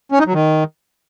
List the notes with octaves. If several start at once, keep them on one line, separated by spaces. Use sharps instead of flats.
C#4
D#4
F#3
D#3